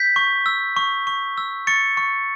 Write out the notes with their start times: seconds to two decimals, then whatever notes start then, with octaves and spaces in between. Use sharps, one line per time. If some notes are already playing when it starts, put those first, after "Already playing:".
Already playing: G6 B6
0.16 C#6
0.46 E6
0.77 C#6
1.07 C#6
1.38 E6
1.67 C#6 A6 C#7
1.97 C#6